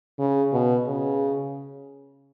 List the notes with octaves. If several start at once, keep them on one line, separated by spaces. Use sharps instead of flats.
C#3
B2
C#3